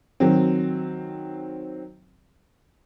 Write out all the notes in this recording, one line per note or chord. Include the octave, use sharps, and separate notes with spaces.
D#3 F#3 C4